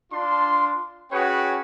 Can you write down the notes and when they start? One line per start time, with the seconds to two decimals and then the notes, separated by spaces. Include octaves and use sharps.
0.12 D4 F4 C6
1.12 C#4 F#4 G#4 B4 C#5 G5